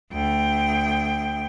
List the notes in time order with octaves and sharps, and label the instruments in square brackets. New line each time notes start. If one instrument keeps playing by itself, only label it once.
[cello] D2 G5